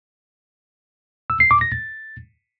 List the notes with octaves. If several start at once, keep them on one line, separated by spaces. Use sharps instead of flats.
E6
C7
D6
A#6
A6